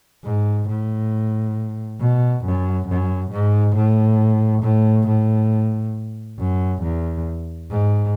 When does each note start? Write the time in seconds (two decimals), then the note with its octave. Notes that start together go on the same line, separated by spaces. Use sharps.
0.24 G#2
0.68 A2
2.00 B2
2.44 F#2
2.88 F#2
3.31 G#2
3.75 A2
4.62 A2
5.07 A2
6.39 F#2
6.82 E2
7.70 G#2